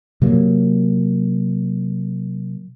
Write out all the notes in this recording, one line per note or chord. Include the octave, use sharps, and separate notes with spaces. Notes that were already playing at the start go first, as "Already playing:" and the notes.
C3 F#3 A#3